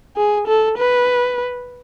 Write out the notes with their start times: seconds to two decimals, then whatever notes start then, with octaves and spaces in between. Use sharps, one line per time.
0.17 G#4
0.47 A4
0.78 B4